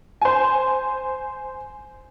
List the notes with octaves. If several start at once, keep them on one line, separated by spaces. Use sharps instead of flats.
C5 G#5